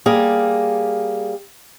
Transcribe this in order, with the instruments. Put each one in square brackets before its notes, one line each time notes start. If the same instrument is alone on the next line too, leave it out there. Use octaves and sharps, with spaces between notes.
[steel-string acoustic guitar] G3 A#3 G#4